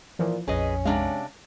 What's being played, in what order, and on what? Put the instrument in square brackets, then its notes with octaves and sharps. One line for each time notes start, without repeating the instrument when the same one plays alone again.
[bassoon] A#2 [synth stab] E3 F3
[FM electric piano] A#1 F2 [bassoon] C#4 [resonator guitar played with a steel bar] G#4 B4 D#5
[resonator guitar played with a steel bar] C3 D4 F5 [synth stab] G#3